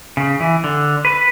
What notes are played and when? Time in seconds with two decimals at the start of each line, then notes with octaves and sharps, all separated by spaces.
0.17 C#3
0.40 E3
0.64 D3
1.05 B4